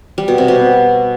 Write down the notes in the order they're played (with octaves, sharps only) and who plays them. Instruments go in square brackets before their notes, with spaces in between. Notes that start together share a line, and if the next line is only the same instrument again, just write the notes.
[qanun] G3
B2
C3
B2